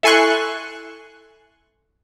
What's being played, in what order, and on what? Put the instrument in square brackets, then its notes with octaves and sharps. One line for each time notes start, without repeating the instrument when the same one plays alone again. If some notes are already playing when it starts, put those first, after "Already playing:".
[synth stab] E4 A4 G#5 C6 C#6 F#6